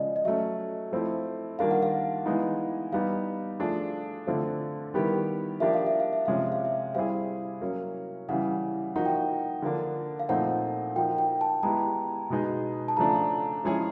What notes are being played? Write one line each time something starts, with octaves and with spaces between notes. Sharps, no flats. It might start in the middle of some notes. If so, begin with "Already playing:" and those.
Already playing: C#3 F3 G#3 D5 D#5
D#5
F#3 A3 C#4 E5
F3 A3 C4 E4
D#3 G3 A#3 D4 F4 F5
F#5
F5
E3 G#3 B3 D#4
G3 B3 D#4 F5
F3 A3 D4 F4 G#4
D3 F3 A3 C4 F4
D#3 G3 B3 E4 G4
F3 A#3 D4 G4 E5
F5
E5
F5
E5
C3 F3 G#3 C#4 F5
E5
F5
E5
G3 C4 E4 G#4 F5
F#3 A#3 C#4
C#3 E3 G3 F#5
F3 A#3 D#4 F#4 F#5
G5
F#5
D3 F3 A#3 D4
F5
A#2 F3 A3 C4 D#4 F#5
F3 A#3 D#4 F#4 G5
G5
A5
G#3 B3 E4 G4 A#5
B2 G#3 B3 D#4 G#4
A5
C#3 F3 A3 D4 A#5
F3 G#3 C#4 E4 G#4